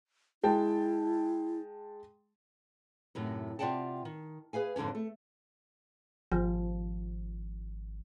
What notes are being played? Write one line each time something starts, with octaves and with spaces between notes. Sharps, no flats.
G#3 E4 G5 A5
F#2 A2 C3 D#4
C3 F4 D5 F#5 G5 A5
D#3
G#4 B4 F5 G#5
F2 G#2 D3 D4 C#5
A3
G#1 F3